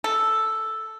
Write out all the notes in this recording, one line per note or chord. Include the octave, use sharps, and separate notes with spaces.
A4